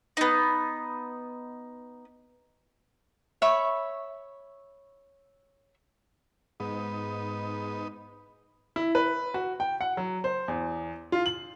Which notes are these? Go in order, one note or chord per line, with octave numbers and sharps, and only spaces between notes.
B3 D#4
C#5 E5 B5 C#6
G#2 B3 D#4
E4
B4
F#4
G5
F#5
F#3
C5
E2
F4
F#7